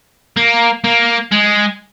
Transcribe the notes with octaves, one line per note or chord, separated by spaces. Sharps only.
A#3
A#3
G#3